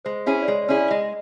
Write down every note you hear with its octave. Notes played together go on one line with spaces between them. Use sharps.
G#3 C5
C#4 E4 G#4
D5
G#3 C#5
D5
C#4 E4 G#4
D5
G#3 D#5